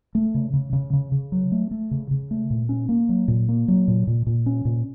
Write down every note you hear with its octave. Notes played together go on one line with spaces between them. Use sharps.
A3
C#3
C#3
C#3
C#3
C#3
F#3
A3
A3
C#3
C#3
A3
A#2
C#4
A#3
F#3
A#2
A#3
F#3
A#2
A#2
A#2
C#4
A#2